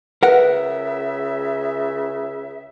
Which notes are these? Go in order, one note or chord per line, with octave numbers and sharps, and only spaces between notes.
C#2 C#3 A#4 B4 E5 F#5